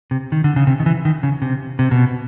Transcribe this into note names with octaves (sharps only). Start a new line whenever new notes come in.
C3
D#3
D3
C#3
C3
D#3
E3
D#3
C#3
C3
C3
B2